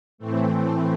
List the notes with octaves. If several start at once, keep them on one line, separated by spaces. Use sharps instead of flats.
A2 E3 A3 C4